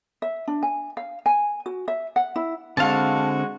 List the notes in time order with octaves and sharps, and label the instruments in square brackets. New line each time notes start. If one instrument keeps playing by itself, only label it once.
[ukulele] E5
D4
G#5
F5
G#5
F#4
E5
F#5
E4
[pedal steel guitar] D3 C4 [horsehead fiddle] G#3 F#4 [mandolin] F5 A5